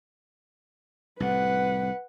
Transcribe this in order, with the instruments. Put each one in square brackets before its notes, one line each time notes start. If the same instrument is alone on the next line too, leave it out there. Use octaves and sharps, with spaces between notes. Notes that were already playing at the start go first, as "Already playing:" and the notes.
[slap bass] C2 A2 [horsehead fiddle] B4 F#5